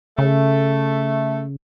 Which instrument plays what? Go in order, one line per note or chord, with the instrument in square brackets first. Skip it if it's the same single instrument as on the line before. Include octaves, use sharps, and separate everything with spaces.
[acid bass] C#3 [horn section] A3